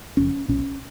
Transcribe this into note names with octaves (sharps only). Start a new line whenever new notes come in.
F#1 F2 C#3 C#4
B1 A#2 C#4